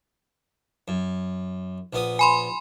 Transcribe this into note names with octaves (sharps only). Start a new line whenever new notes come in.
F#2
A#1 B3 D#6
G#5 B5 C6